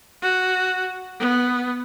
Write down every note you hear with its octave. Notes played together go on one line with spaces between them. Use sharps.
F#4
B3